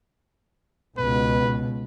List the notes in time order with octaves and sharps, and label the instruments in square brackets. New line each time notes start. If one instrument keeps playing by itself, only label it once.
[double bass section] C#2 B2 [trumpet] B4